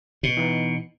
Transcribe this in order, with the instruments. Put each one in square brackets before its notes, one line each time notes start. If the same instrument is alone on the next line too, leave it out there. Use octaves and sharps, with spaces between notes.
[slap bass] B2
[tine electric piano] E3 B3 D#4